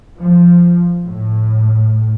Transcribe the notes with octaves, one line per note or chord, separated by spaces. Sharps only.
F3
A2